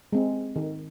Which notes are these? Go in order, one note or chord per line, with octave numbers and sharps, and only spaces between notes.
G#3 C4
D#3